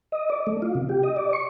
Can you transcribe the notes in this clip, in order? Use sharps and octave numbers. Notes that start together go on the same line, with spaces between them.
D#5
D5
A3
F4
C3
G4
D#5
D5
C#6